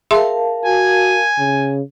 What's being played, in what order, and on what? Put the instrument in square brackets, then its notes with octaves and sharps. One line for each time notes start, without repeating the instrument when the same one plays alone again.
[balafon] G#4 E5 C6 [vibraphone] A#4 F5 A5
[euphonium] F#4 [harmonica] G#5
[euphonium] C#3